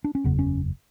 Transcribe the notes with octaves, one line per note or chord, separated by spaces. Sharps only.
D4
C#4
F#1 E2 C#3 B3
C#4